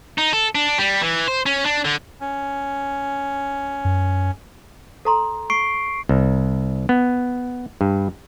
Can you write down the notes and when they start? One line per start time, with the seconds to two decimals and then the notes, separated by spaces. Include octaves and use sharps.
0.18 D#4
0.33 A4
0.55 D4
0.78 G3
1.02 E3
1.28 C5
1.46 C#4
1.65 D4
1.85 D3
2.21 C#4
3.85 F#2
5.05 A4 A#5 C6
5.50 C#6 C7 D7
6.09 C2
6.89 B3
7.81 G2